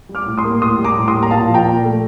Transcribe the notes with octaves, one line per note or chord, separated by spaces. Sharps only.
G3
D6 F6
A2
C6 D#6
A#3
A2 C6 D#6
G3
A#5 D6
A2
C6 D#6
A#3
A#5
A#2 F5 A5
F3
G5 A#5
A#2
A3